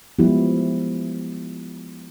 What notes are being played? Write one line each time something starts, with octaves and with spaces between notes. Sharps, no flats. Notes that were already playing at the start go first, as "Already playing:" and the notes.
F3 G#3 B3 E4 G4